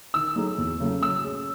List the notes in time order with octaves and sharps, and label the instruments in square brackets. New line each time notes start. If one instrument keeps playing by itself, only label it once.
[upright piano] D#3 [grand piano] E6
[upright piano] F#3 A3 D#4 G#4
E2
C#3 F#3 A3
[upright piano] F#3 [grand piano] E6
[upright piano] C#4 G#4